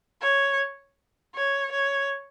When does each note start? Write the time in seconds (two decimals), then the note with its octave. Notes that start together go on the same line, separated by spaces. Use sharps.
0.22 C#5
1.35 C#5
1.72 C#5